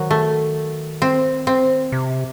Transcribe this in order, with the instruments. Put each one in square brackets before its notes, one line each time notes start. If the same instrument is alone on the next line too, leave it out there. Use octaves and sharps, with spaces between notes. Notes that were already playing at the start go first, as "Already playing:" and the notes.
Already playing: [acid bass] D#3 [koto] F#3
[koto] A3
C4
C4
[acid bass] C3